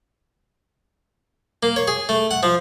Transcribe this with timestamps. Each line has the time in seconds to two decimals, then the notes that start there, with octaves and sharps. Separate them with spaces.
1.63 A#3
1.76 C#5
1.88 G#4
2.09 A3
2.31 F#5
2.43 F3